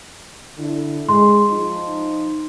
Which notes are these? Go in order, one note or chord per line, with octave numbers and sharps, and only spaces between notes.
D3 E4
G#3 C6
F3 D#4